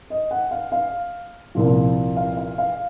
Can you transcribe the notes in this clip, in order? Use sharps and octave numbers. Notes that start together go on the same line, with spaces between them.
D#5
F#5
F5
F5
C2 A#2 F3
F5
F5
F5